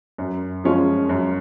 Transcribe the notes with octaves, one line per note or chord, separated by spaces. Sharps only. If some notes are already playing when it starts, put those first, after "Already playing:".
F#2
F3 G#3 C#4 F4
F#2